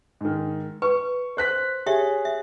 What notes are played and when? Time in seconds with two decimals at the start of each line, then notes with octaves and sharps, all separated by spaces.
0.21 G#2 D#3
0.82 B4 C#6
1.37 C5 F#6 B6
1.86 G4 G#4 C#5 E5
2.25 E5